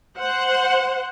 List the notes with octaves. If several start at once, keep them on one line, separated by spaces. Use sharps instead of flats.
C5 F#5